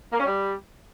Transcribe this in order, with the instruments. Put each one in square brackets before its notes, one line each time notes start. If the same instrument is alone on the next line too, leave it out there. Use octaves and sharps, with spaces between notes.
[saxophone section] A#3
C#4
G3